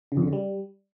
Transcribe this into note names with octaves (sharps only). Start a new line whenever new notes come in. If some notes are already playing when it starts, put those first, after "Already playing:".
C#3
F2
D3
C#3
G3